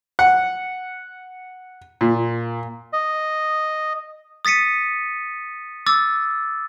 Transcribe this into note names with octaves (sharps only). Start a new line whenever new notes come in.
F#5
A#2
D#5
D#6 A6 B6 C#7 D#7
D6 E6 A6